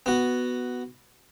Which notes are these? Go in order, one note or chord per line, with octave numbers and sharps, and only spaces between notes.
B3 F#4